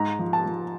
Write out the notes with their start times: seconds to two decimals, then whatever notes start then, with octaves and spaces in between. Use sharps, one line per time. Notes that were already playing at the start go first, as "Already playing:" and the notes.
Already playing: G#2 A#5
0.19 F3
0.33 A5
0.46 F3